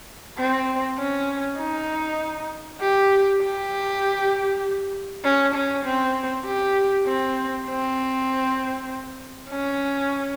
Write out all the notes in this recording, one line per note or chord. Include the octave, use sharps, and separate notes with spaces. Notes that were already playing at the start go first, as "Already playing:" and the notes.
C4
C#4
D#4
G4
G4
C#4
C#4
C4
G4
C4
C4
C#4